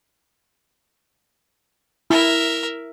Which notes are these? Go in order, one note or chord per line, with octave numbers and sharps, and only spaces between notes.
E4 A#4 E5